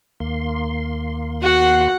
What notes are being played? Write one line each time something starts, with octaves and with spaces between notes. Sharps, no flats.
D#2 A#3 C6
F#4 F#5